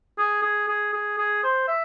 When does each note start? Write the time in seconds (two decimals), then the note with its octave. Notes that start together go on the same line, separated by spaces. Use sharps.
0.18 G#4
0.42 G#4
0.68 G#4
0.93 G#4
1.18 G#4
1.44 C5
1.68 E5